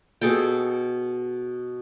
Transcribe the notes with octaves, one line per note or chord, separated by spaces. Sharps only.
B2 G#4 A4 G5